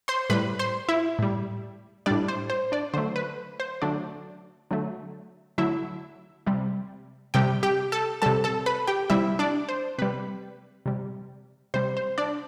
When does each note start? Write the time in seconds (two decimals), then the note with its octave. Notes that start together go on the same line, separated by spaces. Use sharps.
0.08 C5 C6
0.30 A2 G3 B4 B5
0.59 C5 C6
0.89 E4 E5
1.19 A2 G3
2.06 A2 G3 D4 D5
2.28 C5
2.50 C5
2.72 D4 D5
2.94 D3 F#3 A3 C5
3.16 B4
3.60 C5
3.82 D3 F#3 A3 D4 D5
4.71 D3 F#3 A3
5.58 D3 F#3 A3 E4 E5
6.46 C3 G3
7.34 C3 G3 G4 G5
7.63 G4 G5
7.92 A4 A5
8.22 C3 G3 A4 A5
8.44 A4 A5
8.66 B4 B5
8.88 G4 G5
9.10 C3 G3 E4 E5
9.39 D4 D5
9.69 C5
9.98 C3 G3 B4
10.86 C3 G3
11.74 C3 G3 C5
11.97 C5
12.18 D4 D5